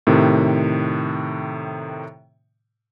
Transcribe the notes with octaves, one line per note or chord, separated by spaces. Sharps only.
A2 C3 D#3